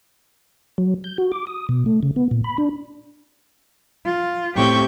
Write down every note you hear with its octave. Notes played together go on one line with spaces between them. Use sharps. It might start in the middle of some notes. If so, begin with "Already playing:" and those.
F#3
G6
F#4
D6
D#6
B2
A3
C#3
B3
A#2
B5
D4
F4
A2 C4 G4 G5 C#6 G6